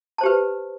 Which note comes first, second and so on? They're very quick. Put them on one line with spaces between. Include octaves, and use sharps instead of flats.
A5 C5 G4 B4